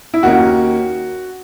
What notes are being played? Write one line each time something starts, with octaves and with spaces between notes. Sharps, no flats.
E4
D#2 D#3 A#3 C#4 F#4